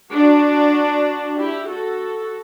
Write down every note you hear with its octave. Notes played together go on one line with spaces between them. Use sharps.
D4 F#4
E4 G4
F#4 A4